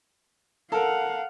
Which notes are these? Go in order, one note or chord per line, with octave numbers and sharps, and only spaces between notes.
A4 A#4 F5 F#5